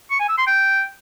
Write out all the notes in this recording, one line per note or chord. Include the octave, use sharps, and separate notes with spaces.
C#6
G#5
E6
C6
G5